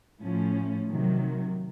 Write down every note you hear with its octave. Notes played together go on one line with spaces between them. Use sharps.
A2 F3 A3 C#4
C3 D#3 F#3